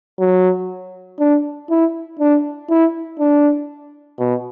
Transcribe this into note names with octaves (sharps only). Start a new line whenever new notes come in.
F#3
D4
E4
D4
E4
D4
B2